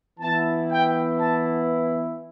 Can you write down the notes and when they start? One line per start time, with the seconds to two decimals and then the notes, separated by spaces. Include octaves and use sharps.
0.19 E3 B3 E4 A5
0.68 G5
1.18 A5